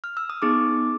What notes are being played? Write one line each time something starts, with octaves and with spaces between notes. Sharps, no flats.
F6
E6
D#6
B3 D#4 G#4 D6